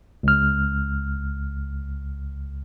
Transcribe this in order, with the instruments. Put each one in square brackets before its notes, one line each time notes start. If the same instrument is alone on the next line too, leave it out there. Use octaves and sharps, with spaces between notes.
[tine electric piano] C#2 F6